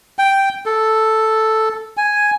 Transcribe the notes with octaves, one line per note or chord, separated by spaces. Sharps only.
G5
A4
G#5